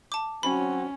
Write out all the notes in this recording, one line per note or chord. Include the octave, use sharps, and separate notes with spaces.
A5 D6
F#3 C4 C#4 F#4 B5